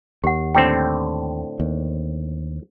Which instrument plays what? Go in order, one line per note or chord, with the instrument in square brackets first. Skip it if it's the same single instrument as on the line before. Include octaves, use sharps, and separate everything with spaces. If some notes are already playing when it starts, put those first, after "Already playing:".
[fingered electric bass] D#2 [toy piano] G4 F#5
[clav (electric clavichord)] A2 D3 C4 [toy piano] G5
[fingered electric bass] D#2